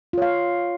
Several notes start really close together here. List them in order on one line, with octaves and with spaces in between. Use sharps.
F4 C#5 F5